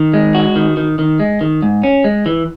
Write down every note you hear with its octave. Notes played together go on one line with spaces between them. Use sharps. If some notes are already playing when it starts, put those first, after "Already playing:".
Already playing: D#3
G#3
F#4
D#3
D#3
D#3
G#3
D#3
G#2
C#4
G#3
E3